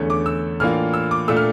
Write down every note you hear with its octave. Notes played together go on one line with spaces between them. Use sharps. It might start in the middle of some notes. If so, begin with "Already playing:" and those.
Already playing: E2 D3 A3 C#4
D6
E6
A2 E3 A#3 D4 F4 F6
E6
D6
A#2 A3 D4 F4 E6
F6